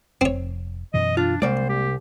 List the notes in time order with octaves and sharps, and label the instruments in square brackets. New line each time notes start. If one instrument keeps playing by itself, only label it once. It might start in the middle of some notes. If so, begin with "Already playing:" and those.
[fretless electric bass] F1 [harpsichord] C4 C#5
[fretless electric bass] F#2 B2 E3 [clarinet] D#5
[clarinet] D4 [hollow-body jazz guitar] F4
[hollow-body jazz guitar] C2 D5 [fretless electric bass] G#3 A#3 [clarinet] C5
[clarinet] G4